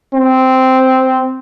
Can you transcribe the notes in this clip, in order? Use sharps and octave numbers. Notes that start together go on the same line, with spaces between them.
C4